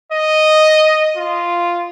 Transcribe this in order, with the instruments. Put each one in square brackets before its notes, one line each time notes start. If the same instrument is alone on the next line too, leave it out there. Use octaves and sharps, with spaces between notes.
[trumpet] D#5
F4